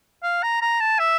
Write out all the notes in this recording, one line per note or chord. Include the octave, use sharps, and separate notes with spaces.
F5
A#5
A#5
A5
E5